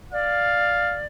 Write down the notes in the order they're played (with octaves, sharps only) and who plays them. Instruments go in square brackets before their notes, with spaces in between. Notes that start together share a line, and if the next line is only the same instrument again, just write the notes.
[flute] D5 [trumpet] F5